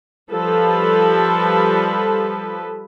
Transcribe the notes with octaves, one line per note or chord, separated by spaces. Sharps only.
F3 G3 A4 B4